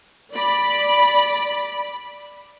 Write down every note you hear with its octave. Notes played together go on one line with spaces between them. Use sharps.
D5 B5